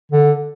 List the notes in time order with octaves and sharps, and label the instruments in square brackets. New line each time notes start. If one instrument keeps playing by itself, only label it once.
[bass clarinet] D3